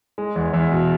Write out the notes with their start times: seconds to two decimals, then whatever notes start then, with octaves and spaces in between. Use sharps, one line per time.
0.18 G#3
0.36 E2
0.53 E2
0.72 B2